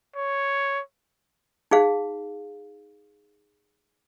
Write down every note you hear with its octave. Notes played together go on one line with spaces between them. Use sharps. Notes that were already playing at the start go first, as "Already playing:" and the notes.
C#5
D#4 G#4 F5